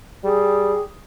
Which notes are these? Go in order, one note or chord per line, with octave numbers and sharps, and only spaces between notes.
G3 G#4